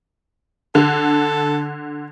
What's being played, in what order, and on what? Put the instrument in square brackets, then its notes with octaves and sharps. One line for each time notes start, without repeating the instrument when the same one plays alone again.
[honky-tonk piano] D3 [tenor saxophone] A4